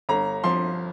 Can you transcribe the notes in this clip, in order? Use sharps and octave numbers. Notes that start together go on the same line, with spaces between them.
G1 A#5
F3 C6